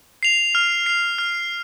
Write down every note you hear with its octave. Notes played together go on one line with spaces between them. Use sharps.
C7 F7
F6
C7 F7
F6